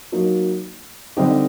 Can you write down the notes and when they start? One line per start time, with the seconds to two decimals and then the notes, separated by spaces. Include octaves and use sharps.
0.12 F#3 A#3 D#4
1.17 D3 G3 C4 D#4 G4